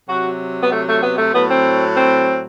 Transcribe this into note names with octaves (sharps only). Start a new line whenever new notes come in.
C3 F#3 F#4
B3
A3
A3
B3
A3
A2 F#3 B3
C4
C4